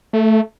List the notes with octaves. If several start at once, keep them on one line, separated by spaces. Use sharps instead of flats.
A3